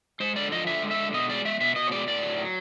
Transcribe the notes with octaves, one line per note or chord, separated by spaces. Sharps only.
G#3 C5
D3 D5
F3 D#5
D3 E5
G#3
E5
D3
B2 D#5
G#3 D5
G#3 E5
B2 E5
B2 D#5
C#5
G#3 D5
A2 D5
F#3
F#3